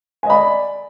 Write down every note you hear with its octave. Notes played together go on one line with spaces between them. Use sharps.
D5 D#5 G#5 B5